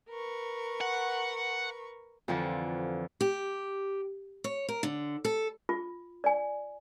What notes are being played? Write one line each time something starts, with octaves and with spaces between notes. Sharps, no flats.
A#4 B4 C#6
F#5
F2 D3 E3 F3
G4
C#5
A#4
D3
A4
F4
D5 G#5